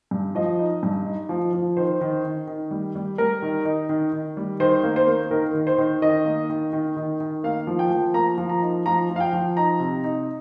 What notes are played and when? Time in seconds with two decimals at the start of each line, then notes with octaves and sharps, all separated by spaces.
0.11 G2
0.35 F3 D#5
0.59 D#4
0.83 G2
1.06 D#4
1.29 F3
1.53 F3
1.77 D#3 C5
2.01 D#3
2.25 D#3
2.47 D#3
2.71 G3
2.95 G3
3.18 G3 A#4
3.42 D#3
3.65 D#4
3.89 D#3
4.12 D#3
4.37 G3
4.60 D#3 C5
4.83 A#3
4.96 C5
5.07 A#3
5.31 D#3 A#4
5.54 D#3
5.67 C5
5.78 D#3
6.02 D#3 D#5
6.25 A#3
6.49 D#3
6.73 D#3
6.96 D#3
7.20 D#3
7.44 A#3 F5
7.67 F3
7.79 G5
7.90 F3
8.14 A#3 A#5
8.38 F3
8.49 A#5
8.62 D#4
8.86 F3 A#5
9.10 F3
9.16 F5
9.20 G5
9.33 F3
9.57 D#4 A#5
9.80 C3
10.04 D#4